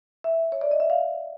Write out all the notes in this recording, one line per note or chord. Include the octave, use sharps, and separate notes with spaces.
E5
C#5
D5
D#5
E5
F5